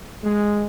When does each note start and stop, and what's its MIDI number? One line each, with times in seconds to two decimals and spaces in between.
0.23 0.64 56